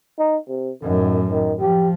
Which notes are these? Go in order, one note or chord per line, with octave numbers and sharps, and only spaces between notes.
D#4
C3
F#2 A2 D#3
D#3
F3 G4